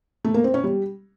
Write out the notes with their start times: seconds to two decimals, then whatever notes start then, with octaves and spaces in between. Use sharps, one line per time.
0.25 A3
0.34 A#3
0.44 C4
0.54 C#4
0.64 G3